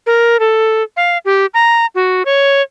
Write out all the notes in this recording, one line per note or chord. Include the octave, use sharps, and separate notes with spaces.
A#4
A4
F5
G4
A#5
F#4
C#5